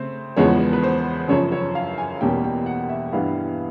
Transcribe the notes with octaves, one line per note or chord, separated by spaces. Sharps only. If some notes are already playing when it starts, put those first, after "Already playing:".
Already playing: C#3 A3 C4 C5
E2 C#3 F3 G#3 B3 C#5
B4
C5
F#2 C#3 F3 C#5
C#5
F5
G#5
E2 B2 G3 A#3 C#4 G5
G5
F#5
E5
G2 E3 G3 B3 F5